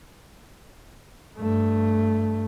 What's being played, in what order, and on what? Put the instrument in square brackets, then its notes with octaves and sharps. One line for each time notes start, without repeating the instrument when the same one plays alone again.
[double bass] G2 A3